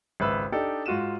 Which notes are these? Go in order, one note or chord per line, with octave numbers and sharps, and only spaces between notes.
G#1 C#2 B4 E5 E6
D4 D#4 G4 A4 D5
G#2 F4 F#4 D#7 E7